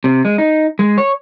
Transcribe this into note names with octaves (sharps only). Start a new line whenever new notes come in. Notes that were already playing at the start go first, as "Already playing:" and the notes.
C3
G#3
D#4
G#3
C#5